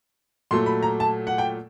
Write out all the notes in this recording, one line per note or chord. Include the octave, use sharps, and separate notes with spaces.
A#2 F#3 A3 C6
B5
A#5
A5
F#5
G5